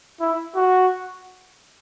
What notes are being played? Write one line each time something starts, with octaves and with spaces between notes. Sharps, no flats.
E4
F#4